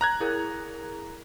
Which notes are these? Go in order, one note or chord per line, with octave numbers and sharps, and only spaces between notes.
A#5 F#6 G#6
E4 G#4 A#4